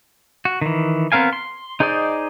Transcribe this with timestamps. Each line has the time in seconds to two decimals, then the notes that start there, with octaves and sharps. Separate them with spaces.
0.45 F#4
0.61 D#3 E3
1.12 B3 C4 A#4 F5 G#5
1.33 C6
1.80 D#4 G#4 C5 D5 D#5